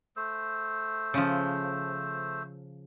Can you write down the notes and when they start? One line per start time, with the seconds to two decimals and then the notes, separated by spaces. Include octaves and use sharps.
0.17 A3 C5 E6
1.14 C#3 F3